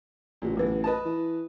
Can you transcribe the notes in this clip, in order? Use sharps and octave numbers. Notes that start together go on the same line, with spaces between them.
A1 A#2 C#3
B1 E3
B4 D#5 A5
E3